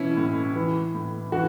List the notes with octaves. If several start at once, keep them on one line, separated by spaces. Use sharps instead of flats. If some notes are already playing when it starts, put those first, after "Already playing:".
Already playing: B2 E3 C#4 E4
A2
E3
A2
E3 F#4